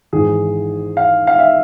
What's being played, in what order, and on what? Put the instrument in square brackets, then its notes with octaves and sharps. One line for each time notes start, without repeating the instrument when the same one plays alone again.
[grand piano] G#1 G#2 E3 G#4
F5
F5
E5